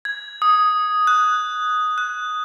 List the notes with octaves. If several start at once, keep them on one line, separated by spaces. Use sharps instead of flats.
G#6
D#6
F#6
F#6